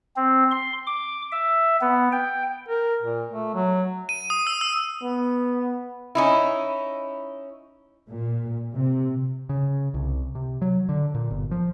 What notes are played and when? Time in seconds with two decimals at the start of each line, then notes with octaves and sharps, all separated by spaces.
0.16 C4
0.51 C6
0.87 D6
1.32 E5
1.81 B3
2.12 G5
2.69 A#4
3.02 A#2
3.31 A3
3.55 F#3
4.09 D#7
4.30 D#6
4.47 E6
4.61 E6
5.03 B3
6.15 C#4 D#4 E4
8.08 A#2
8.74 C3
9.49 C#3
9.94 C2
10.35 C3
10.62 F#3
10.89 D3
11.14 A#2
11.31 G1
11.51 F3